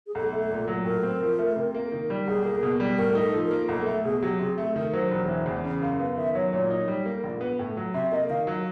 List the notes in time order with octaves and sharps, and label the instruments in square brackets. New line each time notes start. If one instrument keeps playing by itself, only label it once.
[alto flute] G#4
[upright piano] B1 [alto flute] A4
[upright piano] A3
A#2
F#3
[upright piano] A2 [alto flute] A#4
[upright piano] C4
F3
A3
C3
A#3
D#3
G3
[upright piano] B1 [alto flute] G#4
[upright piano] A#3
B2
G3
[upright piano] A2 [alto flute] A#4
[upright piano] D#4
[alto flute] A4
[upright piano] F3
[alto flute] A#4
[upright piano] A#3
[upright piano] B1 [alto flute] A4
[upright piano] A3 [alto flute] A4
[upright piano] B2 [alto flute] G#4
[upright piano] F#3 [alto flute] G4
[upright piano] C3 [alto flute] G#4
[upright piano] A3 [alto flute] A4
[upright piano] D#3 [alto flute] A#4
[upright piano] F#3 [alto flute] C5
[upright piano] E1
E3
E2
C#3
[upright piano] F#2 [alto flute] F5
[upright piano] B3 [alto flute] F5
[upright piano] D#3 [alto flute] E5
[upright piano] F#3 [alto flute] C#5
[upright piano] A#2 [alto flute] C#5
[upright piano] D#4
G3
A#3
A#1
B3
A2
F#3
[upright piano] C3 [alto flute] E5
[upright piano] A#3 [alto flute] D#5
[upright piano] D#3 [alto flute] F5
[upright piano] F#3